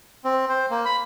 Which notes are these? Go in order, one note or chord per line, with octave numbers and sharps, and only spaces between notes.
C4
C5
A#3
B5